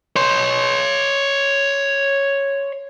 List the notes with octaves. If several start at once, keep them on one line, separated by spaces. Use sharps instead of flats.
C#5 C6